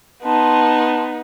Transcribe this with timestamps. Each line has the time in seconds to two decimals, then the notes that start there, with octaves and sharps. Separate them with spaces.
0.23 B3 D#4 A5 C6